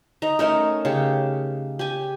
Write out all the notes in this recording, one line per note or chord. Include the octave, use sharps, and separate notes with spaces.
D#4 A#5
A3 C#4 D#4 A#4
C#3 G4
G4 G#5